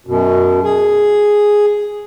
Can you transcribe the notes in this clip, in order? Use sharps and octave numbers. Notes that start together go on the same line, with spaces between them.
F#2 B2
G#4